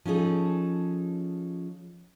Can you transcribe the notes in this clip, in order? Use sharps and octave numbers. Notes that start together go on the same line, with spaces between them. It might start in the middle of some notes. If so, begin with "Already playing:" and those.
F3 C#4 D#4 G#4 A4